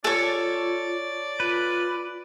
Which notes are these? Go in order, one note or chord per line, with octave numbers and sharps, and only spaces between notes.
F4 A4 C#5 D5
F4 B4